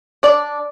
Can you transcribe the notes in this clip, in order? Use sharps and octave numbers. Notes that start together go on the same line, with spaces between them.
D4 D5